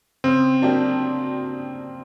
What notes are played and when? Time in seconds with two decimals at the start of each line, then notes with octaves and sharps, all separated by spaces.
0.24 C#3 C4
0.62 F#3 A#3 D4 G4